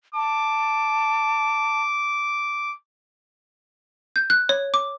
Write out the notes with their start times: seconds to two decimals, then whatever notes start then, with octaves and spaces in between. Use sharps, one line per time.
0.15 A5 D6
4.16 G6
4.30 F#6
4.49 C#5
4.74 D6